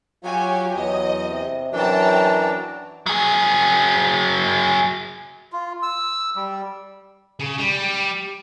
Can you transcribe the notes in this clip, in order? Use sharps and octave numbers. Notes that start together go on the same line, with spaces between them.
F#3 F4 G4 C#5 G#5
E2 F#3 D#5
C3
F#2 E3 F#3 D4 G5 A5 A#5
F#3 G#4
F4
E6
G3
C#3
G3